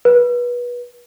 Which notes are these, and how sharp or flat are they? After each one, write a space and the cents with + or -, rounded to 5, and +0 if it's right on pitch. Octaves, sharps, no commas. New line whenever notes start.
B4 -25